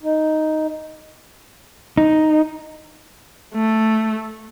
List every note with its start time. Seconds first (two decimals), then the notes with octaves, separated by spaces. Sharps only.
0.03 D#4
1.97 D#4
3.54 A3